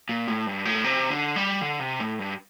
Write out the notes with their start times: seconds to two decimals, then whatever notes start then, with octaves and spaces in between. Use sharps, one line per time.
0.09 A#2
0.28 A2
0.47 G2
0.65 A2
0.84 C3
1.11 D3
1.36 G3
1.61 D3
1.80 C3
2.00 A2
2.19 G2